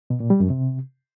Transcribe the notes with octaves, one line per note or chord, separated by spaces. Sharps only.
B2
A#2
G3
F#2
C3